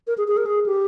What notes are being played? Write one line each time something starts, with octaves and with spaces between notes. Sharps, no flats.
A#4
G#4
G#4
A#4
G#4
G4